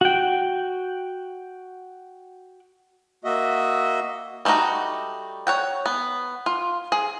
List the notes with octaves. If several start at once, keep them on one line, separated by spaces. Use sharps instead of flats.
F#4 G5
A#3 F#4 D#5 E5
G3 A3 D4 D#4 F#4
C#5 F#5 G5
B3
F4
G#4